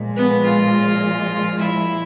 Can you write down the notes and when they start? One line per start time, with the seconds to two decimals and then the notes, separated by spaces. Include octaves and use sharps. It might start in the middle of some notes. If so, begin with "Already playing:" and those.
Already playing: A#2 F3 G#3
0.17 B3
0.45 F4
1.59 E4